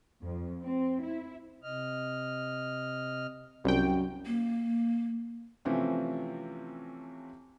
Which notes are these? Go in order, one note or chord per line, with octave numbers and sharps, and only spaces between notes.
F2
C4
E4
C3 D#5 F6
C2 F#2 G5
A#3
C3 E3 F3 A3 C4 C#4